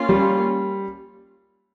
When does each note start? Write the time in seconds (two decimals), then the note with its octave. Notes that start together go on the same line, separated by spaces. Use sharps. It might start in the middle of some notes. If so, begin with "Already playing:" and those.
Already playing: A#3 C#4 F4
0.09 G3